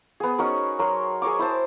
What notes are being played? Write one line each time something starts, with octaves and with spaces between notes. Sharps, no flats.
B3 G#4
C#4 D#4 F#4 A#4
F#3 A#4 C6
G#4 A#4 C#5 D6
E4 C5 A5